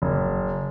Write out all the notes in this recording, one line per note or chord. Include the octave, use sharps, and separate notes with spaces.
F#1